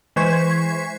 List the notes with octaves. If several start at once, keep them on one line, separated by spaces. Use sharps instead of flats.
E3 G#3 C5 C#6 G#6 B6